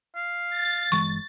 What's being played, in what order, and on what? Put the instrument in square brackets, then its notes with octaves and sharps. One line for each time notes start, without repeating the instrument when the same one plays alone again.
[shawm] F5
[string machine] A6
[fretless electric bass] G1 E3 G#3 [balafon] C#6